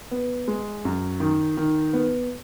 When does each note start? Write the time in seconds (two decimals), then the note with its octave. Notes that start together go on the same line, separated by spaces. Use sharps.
0.11 B3
0.48 G#3
0.85 F#2
1.20 D#3
1.57 D#3
1.93 B3